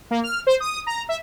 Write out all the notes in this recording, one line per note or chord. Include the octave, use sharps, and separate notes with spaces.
A#3
F6
C5
D#6
A#5
E5